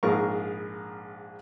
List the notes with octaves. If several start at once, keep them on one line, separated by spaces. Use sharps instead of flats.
A#1 G#2 G#4 A#4 F5 C#6